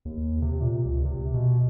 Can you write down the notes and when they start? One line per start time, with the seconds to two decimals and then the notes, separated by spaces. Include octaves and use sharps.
0.05 D#2
0.42 C3
0.61 A#2
0.85 C#2
1.05 C3
1.34 B2